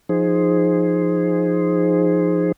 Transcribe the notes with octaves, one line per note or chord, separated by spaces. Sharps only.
F3 D#4 G#4 C5